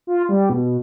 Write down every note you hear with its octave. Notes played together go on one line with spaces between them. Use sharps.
F4
G3
B2